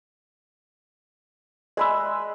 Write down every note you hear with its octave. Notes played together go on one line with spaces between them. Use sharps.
G#3 B4 D5 E5 B5